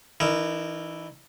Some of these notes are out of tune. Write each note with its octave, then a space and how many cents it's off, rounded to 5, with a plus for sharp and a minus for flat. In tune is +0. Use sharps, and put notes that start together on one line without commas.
E3 +0 D#4 -40 A#4 -5